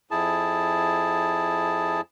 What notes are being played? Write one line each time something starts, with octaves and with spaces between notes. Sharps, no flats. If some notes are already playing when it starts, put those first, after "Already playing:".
F2 E4 G#4 A5